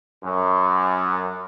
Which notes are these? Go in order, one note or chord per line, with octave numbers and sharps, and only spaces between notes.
F#2